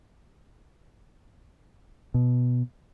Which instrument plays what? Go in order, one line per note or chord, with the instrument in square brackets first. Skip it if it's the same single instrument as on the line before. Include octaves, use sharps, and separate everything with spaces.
[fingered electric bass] B2